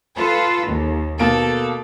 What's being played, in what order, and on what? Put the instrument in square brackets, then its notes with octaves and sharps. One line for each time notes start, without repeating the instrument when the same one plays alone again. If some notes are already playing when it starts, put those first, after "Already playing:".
[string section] F4 A4 B4
D#2
[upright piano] B2 A#3 D7 [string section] A4